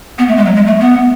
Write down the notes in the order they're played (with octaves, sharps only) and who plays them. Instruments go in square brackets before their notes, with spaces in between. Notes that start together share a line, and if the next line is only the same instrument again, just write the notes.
[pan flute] B3
A3
G#3
F#3
G#3
A3
B3